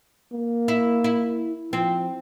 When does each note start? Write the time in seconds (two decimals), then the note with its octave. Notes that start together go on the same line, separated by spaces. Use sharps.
0.33 A#3
0.68 E4
1.04 E4
1.73 F3 C4